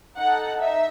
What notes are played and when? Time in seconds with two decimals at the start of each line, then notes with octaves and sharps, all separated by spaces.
0.17 D#4 A4 F#5
0.60 D#4 E5